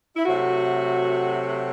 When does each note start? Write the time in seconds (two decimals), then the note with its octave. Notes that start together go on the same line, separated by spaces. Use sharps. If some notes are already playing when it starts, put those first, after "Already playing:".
0.16 E4
0.25 C3 F#3 A3 F#4